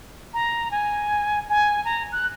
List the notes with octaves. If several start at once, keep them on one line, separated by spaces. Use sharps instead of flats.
A#5
G#5
G#5
A#5
F#6